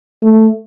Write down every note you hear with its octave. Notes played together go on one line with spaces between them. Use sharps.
A3